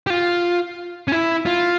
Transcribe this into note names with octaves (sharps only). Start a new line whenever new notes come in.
G4
F4
C#4
E4
F4